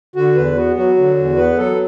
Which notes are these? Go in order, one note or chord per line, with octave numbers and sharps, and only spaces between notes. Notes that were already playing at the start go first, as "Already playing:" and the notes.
D3 F#4
E2 B4
B3 F#4
F#3 F#4
D3
E2
B3 B4
F#3 A4